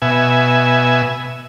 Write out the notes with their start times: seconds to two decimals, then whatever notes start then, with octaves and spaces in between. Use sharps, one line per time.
0.02 B2 E5 G#5